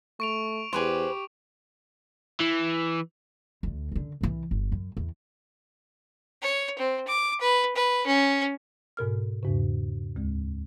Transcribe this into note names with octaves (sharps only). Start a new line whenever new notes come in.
A3 C#6 D7 F7
E2 G4 G#4 B4 C5
E3
D2 D3
F#2 D3
C2 E3
G1
F#2
E2
C#5
C4
D6
B4
B4
C#4
G#2 B2 A#4 F6
E2 G#2 C#3
D2 G#3